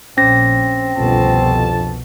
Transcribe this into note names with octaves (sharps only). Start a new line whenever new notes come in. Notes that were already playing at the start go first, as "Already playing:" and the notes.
A#1 A#2 C4 C#4 A#6
G1 C2 F2 B2 A5